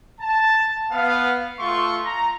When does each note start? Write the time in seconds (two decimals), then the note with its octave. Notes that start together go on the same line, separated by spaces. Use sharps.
0.21 A5
0.91 B3 F5
1.59 A3 F4 A4 C6 C#6
2.05 A#5